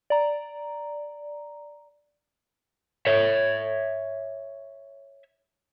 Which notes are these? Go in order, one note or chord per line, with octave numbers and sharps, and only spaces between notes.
D5 A#5
C#5 E5